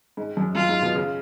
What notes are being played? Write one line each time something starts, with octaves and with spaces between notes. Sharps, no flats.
G#2
F#2
F#2 F4
G#2
B2
C#3